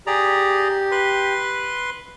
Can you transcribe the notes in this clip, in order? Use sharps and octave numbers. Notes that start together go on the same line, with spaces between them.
G4 G#4 D5 A#5
B4 C6